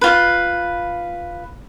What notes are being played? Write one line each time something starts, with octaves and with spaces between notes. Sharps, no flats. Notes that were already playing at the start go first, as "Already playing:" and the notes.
F4 B4